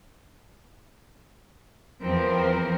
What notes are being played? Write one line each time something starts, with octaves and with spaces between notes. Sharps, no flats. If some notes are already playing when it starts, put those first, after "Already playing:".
E2 F3 C4 A#4